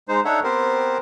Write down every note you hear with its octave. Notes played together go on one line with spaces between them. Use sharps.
G#3 D#4 C5
D4 D#4 A4 C#5 E5 F#5
B3 C4 G4 A#4 C5